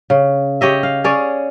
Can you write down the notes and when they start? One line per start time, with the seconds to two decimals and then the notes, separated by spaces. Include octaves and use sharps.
0.10 C#3
0.61 G4 C#5 D#5 E5
0.83 F5
1.04 C#4 G#4 C#5 D5